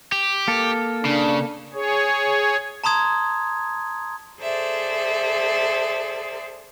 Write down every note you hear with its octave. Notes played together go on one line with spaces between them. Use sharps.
G4
A#3 A4
C#3 D4
G#4 C#5
A5 A#5 C6 D#6 G#6
G#4 A4 C5 D5 E5